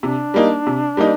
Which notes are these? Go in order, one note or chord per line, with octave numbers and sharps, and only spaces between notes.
C3 D4
G3 A#3 D#4
C3
G3 A#3 D#4